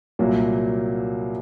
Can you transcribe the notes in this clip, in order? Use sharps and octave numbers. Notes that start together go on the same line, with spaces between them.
C2 A#2 F#3 A#3